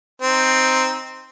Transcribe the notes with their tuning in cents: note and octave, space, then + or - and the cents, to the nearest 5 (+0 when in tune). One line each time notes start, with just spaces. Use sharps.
C4 +0 D#4 +0